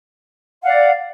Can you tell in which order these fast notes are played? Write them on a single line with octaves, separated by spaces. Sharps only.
F5 F#5 D5